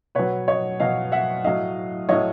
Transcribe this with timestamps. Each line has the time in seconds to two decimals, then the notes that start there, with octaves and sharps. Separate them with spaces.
0.15 B2 F#3 B4 C#5
0.48 C#5 D#5
0.80 B2 F#3 D#5 F5
1.12 E5 F#5
1.44 A2 F#3 D#5 F5
2.09 A2 F#3 C#5 D#5